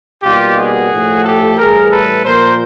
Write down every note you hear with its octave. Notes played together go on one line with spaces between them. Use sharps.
B2 G3 A#3 D#4 F4 G4
F#4 G#4
A2 F3 A3
G4 A4
A2 E3 G3 G#4 A#4
A4 B4
A#2 F3 A#3 A#4 C5